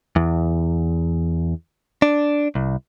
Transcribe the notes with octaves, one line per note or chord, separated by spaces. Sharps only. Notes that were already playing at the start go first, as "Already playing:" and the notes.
E2
D4
C2